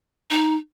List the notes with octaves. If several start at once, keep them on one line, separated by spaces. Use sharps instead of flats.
D#4